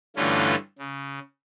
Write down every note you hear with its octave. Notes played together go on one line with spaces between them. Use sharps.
G2 D3 E3 A3 C#4 F4
C#3